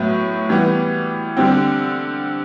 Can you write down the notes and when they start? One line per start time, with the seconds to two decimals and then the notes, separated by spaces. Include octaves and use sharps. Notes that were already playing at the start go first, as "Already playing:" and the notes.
Already playing: A2 F#3 B3
0.49 E3 G3 B3
1.37 D3 G3 C4